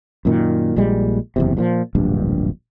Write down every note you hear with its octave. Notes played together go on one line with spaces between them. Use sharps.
F#2 A#2 D#3
A#1 A#2 G3 G#3
F#1 E2 C3
G2 A#2 F3
D1 A#1 G2